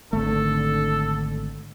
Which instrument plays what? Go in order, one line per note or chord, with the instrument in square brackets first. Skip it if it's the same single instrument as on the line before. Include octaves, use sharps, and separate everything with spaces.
[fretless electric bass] G#1 A3 [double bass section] D3 [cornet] A4